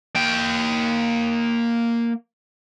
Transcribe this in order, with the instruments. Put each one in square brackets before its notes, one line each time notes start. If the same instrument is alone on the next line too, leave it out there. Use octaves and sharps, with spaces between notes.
[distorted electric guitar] A#3 G5